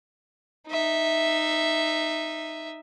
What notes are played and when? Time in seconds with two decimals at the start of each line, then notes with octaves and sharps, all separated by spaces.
0.68 D#4 E5